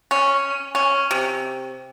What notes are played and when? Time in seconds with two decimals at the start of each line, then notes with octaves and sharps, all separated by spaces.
0.11 C#4
0.75 C#4
1.11 C3